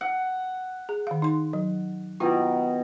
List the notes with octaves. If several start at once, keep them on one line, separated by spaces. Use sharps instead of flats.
F#5
G#4
D#3 F5
D#4 C6
F#3
B2 D#3 E4 F4